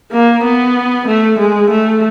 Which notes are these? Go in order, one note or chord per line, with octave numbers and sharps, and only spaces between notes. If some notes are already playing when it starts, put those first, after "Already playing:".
A#3
B3
A3
G#3
A3